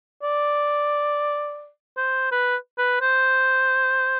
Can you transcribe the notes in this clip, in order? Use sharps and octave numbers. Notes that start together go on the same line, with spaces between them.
D5
C5
B4
B4
C5